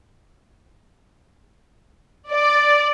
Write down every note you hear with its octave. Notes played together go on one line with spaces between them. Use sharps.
D5